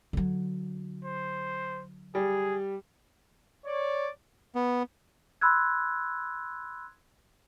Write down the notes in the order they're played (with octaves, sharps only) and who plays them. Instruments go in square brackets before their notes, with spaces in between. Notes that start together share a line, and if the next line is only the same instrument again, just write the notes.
[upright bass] D3 F#3
[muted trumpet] C5
[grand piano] G3 [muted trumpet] G#4
[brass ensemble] C#5 D5
[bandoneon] B3
[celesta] B5 C6 E6 F#6 G#6